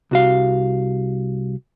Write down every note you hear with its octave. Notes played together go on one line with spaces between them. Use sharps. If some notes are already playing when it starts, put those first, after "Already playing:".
C2 F#4 F5